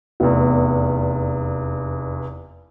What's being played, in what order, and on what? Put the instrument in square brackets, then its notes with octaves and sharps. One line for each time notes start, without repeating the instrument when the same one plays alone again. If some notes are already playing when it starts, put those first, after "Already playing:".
[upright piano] F1 E2